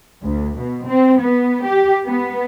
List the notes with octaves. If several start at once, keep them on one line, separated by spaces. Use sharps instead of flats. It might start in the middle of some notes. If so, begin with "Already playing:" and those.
D2
B2
C4
B3
G4
B3